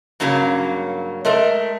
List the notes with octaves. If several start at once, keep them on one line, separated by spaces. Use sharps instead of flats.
G2 C#3 F#3 A#3 C#4
G#3 A3 A#4